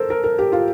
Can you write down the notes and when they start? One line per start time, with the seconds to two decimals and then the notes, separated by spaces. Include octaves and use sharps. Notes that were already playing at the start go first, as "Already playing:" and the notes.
Already playing: A4 A#4 C5
0.10 A#4
0.24 A#4
0.38 G4
0.52 F4